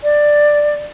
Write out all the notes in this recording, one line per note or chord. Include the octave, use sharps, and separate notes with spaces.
D5